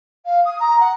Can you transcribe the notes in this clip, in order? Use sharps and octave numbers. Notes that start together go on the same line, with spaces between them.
F5
D#6
A#5
F#5